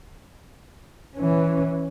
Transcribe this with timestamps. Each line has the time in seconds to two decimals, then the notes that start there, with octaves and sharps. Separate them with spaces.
1.16 E3 C#4